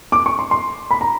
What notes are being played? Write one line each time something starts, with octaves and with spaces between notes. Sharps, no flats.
D6
C#6
C6
C6
B5
A#5